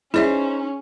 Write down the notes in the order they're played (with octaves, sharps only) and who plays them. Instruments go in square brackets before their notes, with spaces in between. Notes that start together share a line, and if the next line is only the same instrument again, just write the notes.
[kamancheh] C#4 [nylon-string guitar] D#4 C5 [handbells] E4 [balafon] G#4 D5 E5